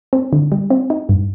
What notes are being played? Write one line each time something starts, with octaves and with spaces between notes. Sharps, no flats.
C4
D3
G3
C4
D#4
G2